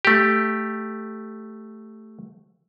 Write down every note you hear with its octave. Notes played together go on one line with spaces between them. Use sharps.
A3 G4